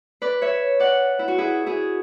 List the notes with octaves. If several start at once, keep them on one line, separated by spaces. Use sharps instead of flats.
B4 D5
C#5 E5
D5 F#5
E4
F#4
E4 G#4
E4 G#4